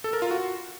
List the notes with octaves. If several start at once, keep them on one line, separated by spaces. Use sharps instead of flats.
A4
A#4
F4
F#4